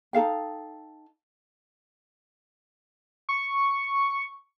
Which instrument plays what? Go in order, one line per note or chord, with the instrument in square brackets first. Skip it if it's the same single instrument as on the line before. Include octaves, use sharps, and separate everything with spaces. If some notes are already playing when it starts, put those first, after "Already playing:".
[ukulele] D#4 A4 F5 G5
[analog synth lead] C#6